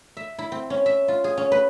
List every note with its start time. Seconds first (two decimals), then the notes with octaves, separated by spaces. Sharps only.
0.17 E5
0.39 E4
0.52 C4
0.70 C#4
0.86 E5
1.08 F4
1.24 G#4
1.37 C#4
1.52 B4